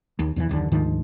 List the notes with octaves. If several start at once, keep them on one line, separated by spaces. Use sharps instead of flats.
D#2
E2 D3 E3
F#1 D#2 D3
D2 G#2 D#3 F3